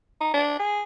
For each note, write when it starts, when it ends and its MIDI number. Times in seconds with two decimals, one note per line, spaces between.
0.21 0.33 63
0.34 0.59 62
0.60 0.83 68